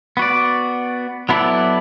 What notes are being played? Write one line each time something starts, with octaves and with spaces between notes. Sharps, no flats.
B3 F#4 D5
F#3 B3 E4 A4 D5